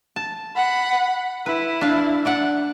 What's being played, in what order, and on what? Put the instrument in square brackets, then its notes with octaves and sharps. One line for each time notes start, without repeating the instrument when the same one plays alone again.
[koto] A5
[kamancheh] F#5 B5
[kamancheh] E4 [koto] B4
[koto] D4 F5
D4 D5 F#5